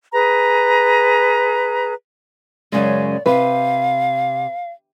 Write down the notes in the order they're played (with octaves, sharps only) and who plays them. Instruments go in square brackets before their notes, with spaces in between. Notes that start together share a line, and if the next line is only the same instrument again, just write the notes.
[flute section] G#4 B4 A#5
[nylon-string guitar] F#2 C#3 G#3 [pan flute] D5
[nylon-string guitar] C3 [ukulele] B4 [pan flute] F5